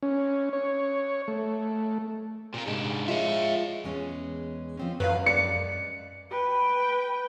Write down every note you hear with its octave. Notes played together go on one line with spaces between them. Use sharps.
C#4
C#5
A3
A#2 C4 F4
G#2 C3 G#3 D4
F3 G#3 F4 C#5 E5
E2 G#3 C#4
F3 C4 C#4
F#2 B4 C5 F5
G#3 D5 C#7
B4 G5